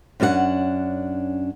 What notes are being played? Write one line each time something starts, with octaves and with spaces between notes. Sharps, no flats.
F#2 C#4 D4 F#4 F#5